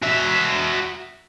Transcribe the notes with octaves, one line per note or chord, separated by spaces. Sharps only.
F#4 E5